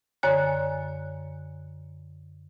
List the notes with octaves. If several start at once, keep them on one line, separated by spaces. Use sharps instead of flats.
F#2 D3 C#5 G#5 F#6